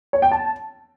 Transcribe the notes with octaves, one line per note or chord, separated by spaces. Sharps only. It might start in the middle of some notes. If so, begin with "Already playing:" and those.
C#5
G5
A5